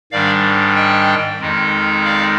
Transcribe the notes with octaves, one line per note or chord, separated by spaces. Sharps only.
G#2 D#3 G3 D4 D5 F5
D#5 G5
F2 D#3 G#3 D#4
D5 F5